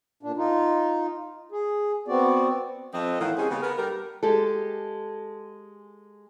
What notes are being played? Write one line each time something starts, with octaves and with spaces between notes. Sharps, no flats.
A#2 D4
D#4 F4
G#4
B3 C4 F#4 D5
F2 C4 D#5
A2 D#3 E3 B3 F5 F#5
G3 C4 C#4 D#4 G#4
C#3 A#3 B3
B3 A#4
G2 G3 G4 A4 A#4
G#3 G4 A4